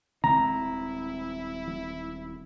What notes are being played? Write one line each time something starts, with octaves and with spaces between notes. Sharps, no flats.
D#1 G#3 C4 E4 A#5